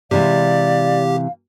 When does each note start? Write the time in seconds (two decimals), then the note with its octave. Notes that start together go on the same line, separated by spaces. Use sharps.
0.11 C3 E3 G#3 G4 D5 F5